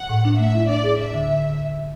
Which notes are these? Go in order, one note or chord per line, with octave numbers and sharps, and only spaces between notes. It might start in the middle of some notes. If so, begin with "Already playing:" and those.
Already playing: F#5
A2
D4
A3 E5
E4
D4 D5
G#4
D2 E5
D3